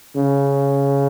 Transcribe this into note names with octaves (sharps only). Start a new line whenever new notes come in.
C#3